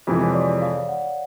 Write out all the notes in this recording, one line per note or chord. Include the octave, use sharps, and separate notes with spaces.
F2 C3 E3 G#3
C#5
D5
F5
F#5